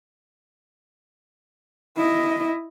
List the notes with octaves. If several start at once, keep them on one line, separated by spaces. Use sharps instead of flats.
E4 D#5